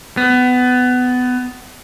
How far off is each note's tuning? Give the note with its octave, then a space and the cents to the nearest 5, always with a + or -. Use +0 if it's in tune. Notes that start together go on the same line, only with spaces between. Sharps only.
B3 +20